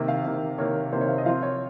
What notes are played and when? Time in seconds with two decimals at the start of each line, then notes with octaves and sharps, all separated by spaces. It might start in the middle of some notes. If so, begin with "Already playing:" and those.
Already playing: C3 D#3 A#3
0.08 F5
0.25 C3 D#3 A#3
0.58 C3 D#3 A#3 C#5
0.93 C3 D#3 A#3 C5
1.01 C#5
1.08 F5
1.18 D#5
1.26 F3 C4 F4 F5
1.43 C#5